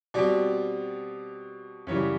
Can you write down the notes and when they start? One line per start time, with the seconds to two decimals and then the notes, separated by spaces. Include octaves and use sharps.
0.14 B2 G3 C4 D5
1.87 F#2 C#3 E3 G3 C#5